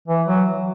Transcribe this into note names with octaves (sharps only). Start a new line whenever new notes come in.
E3
F#3